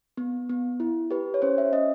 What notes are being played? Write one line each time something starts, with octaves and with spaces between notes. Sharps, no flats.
B3
B3
E4
G4 B4
C#5
C#4 C5
E5
C#4 D#5